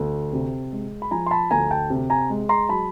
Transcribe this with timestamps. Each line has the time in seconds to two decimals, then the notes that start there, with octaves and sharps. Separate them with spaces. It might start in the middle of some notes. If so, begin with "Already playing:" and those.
Already playing: D2
0.33 C3
0.72 G#3
1.02 B5
1.11 F3 G#5 A#5
1.26 C6
1.31 A5 B5
1.51 D2 G#5 A#5
1.71 G5 A5
1.90 C3
2.10 G#5 A#5
2.30 G#3
2.49 A#5 C6
2.69 F#3 A5 B5